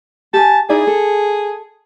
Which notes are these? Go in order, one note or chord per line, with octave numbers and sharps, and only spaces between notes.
G4 G#5 A5
D#4 E4 G#4 D5
A4